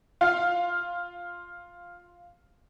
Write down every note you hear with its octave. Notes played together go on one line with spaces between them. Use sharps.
F4 F5